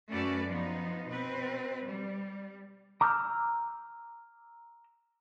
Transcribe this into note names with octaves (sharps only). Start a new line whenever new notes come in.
F#2 A3 C#4 F#4 B4 D5
F3 B3 D#4
B2 C4 B4
G3
A#5 D6 E6 F6 G6